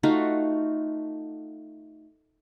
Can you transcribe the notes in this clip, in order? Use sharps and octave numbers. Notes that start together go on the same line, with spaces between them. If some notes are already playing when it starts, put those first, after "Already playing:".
A3 D#4 F4 F#4